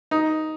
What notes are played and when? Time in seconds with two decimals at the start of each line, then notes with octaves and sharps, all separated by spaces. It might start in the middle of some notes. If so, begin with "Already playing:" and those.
0.11 D#4